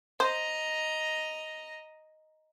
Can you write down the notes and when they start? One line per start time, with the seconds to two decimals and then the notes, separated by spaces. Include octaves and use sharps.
0.20 C5 D#5 A#5